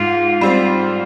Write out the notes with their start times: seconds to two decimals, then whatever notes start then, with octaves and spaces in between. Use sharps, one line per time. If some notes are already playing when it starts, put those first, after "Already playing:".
Already playing: G#2 F4
0.41 G3 C4